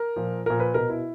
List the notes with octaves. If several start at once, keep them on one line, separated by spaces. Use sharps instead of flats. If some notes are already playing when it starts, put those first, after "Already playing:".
Already playing: A#4
A#2 F3
A#2 F3 A#4
B4
B2 A#4
E4